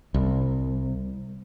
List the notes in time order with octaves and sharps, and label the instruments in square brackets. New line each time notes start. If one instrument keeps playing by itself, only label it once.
[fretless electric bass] C2